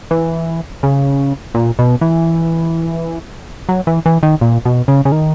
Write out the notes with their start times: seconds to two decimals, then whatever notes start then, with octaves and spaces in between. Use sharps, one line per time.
0.11 E3
0.83 C#3
1.54 A#2
1.79 B2
2.01 E3
3.69 F#3
3.87 E3
4.06 E3
4.23 D#3
4.41 A#2
4.65 B2
4.88 C#3
5.05 C#3
5.12 D#3